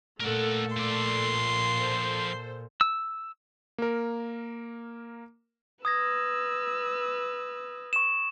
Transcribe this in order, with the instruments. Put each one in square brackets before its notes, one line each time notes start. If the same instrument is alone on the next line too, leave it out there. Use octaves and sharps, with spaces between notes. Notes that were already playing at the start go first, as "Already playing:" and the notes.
[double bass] A#2 [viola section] A3 A4 [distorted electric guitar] A#4 F#5
[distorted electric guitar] F3 D5 [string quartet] C6
[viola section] A4 C5
[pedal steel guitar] E6
[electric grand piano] A#3 A#4
[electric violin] B4 E6 [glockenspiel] D#6 G#6 A#6
[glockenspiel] C#6 E7